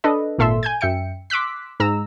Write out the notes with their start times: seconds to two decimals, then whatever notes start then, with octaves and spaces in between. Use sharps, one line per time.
0.04 D4 A4 B4 D#5
0.38 G#1 A#2 A4 E5 C6 E6
0.63 G#5 G6 G#6
0.81 F#2 E5 G5 C#7
1.30 C6 D6 E6 F#6 B6
1.80 G#2 G#3 A#5 E6